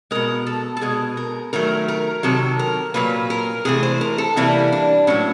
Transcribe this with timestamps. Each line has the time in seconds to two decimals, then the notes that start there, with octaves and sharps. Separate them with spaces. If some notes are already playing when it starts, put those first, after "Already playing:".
0.11 B2 G#3 A#4
0.46 A4
0.77 A4
0.81 B2 G#3 G#4
1.17 A#4
1.53 D#3 F#3 A3 A#4
1.88 A#4
2.23 C3 D#3 F#3 A4
2.59 A#4
2.94 A#2 F#3 A#3 B4
3.30 A#4
3.65 C3 E3 A3 G#4
3.83 C5
4.01 A#4
4.18 A4
4.37 C3 E3 G3 A#3 E4
4.72 D4
5.07 A2 F#3 A#3 C#4